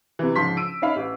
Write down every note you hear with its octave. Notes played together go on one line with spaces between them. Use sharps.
C3 E3
G#2 C#3 F3 C6 B6
E6 D7 D#7
C#4 D#4 E5 F5 B5
A1